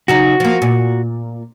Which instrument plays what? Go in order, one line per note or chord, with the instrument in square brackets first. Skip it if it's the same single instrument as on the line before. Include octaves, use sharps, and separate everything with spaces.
[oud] C#3 F#3 D#4 [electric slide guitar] F#4
[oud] F3 A#3
A#2